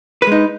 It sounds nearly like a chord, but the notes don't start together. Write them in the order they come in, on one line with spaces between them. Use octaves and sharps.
B4 G#3 D#4